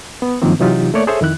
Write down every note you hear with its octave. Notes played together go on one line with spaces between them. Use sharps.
B3
G2 D#3 F3 F#3 A#3 C4
C3 E3 F#3 D#4 F4 G4
A3 A#3 C#5 D5
G#4 A4 C5 C#5 E5
F2 D#3 E4 F#6